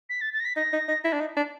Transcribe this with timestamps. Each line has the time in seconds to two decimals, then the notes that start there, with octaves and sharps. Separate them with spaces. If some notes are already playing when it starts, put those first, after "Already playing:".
0.10 B6
0.21 A6
0.34 A6
0.40 A#6
0.45 B6
0.56 D#4 A#6
0.73 D#4
0.88 D#4
1.04 E4
1.13 D4
1.20 D#4
1.37 D4